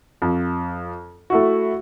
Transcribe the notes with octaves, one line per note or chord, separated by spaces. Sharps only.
F2
A3 E4 F#4